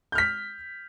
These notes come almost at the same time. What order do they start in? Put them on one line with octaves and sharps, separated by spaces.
G6 F6 B6